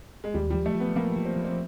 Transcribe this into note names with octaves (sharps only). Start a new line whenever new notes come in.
G#3
D#2 G3
F3 G3
A3
F3
B3
F3 A#3
F3
C4
F3
C4